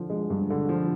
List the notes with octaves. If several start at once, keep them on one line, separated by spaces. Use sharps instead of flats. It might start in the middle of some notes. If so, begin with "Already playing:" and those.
Already playing: D3 F3
G#3
G2
D3
F3